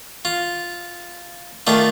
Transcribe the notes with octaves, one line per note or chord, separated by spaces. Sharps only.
F4
D#3 A3 D4 F4